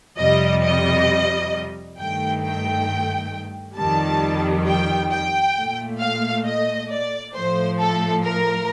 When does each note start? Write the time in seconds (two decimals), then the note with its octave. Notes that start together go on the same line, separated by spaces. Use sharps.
0.18 F2 C3 G3 D#5
0.63 D#5
1.97 G2 D#3 A3 G5
2.43 G5
3.77 F2 D#3 G3 A5
4.66 G5
5.11 G5
5.56 A#2 A3
6.01 F5
6.46 D#5
6.90 D5
7.34 A2 F3 A3 C5
7.79 A4
8.24 A#4